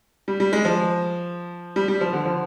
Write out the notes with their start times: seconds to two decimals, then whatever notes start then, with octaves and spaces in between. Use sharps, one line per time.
0.28 G3
0.40 G3
0.53 G#3
0.65 F3
1.76 G3
1.88 G3
2.01 F3
2.13 D3
2.25 F3